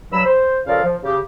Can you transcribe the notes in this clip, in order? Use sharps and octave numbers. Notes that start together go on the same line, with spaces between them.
G2 F#3 B5 E6
C5
C#3 F3 A4 A#4 D5 F5
F3
C#3 G4